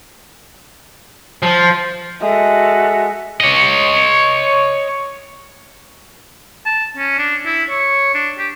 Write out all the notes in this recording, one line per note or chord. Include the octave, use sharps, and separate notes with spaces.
F3
G#3 F#4 A4 E5
C#5 D#5
A5
C#4
D4
E4
C#5
D4
G4